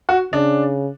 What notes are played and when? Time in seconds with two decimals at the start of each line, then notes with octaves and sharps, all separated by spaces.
0.09 F#4
0.33 C#3 D4